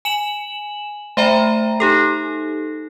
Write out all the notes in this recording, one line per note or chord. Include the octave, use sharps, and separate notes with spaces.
G#5 E7 F#7
A3 C5 E5 G5 A#5 B5
D#4 G4 A4